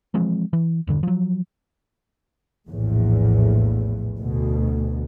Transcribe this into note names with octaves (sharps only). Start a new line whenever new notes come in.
E3 F3 G#3 C4
E3
E1 G2 D3
F3 F#3
A#1 E2 A2
D2 B2